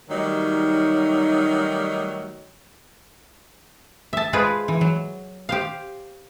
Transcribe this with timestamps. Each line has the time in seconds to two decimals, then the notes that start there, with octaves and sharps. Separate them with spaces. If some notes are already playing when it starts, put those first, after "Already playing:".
0.10 D#3 F#3 G3 A3 D#4
4.13 E5 A5
4.33 G#3 F4 G#4 B4 C5
4.68 E3
4.81 F#3
5.49 G4 C5 F5